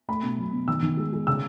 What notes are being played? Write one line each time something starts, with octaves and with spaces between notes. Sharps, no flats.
A3 B5
B2
F#3
B2
D#3 E6
D#3
G#3
G#3
C#3 E6